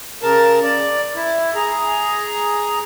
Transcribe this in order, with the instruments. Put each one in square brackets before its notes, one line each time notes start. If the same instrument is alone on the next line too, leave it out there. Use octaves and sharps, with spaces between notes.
[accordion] C#3 A#4 A5
D5
E4
G#4 A#5